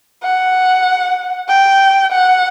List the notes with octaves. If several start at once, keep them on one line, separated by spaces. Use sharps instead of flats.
F#5
G5
F#5